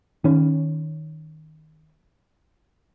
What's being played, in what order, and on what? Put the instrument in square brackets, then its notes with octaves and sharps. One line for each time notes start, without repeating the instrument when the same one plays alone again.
[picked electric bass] D#3 C#4